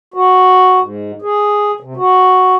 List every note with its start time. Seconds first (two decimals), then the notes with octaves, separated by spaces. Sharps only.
0.14 F#4
0.80 G#2
1.22 G#4
1.80 C3
1.97 F#4